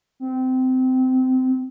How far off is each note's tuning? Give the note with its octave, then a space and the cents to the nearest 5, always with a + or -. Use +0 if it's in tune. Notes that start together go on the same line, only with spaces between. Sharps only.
C4 -20